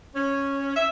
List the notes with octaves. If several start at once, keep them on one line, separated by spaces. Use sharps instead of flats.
C#4
E5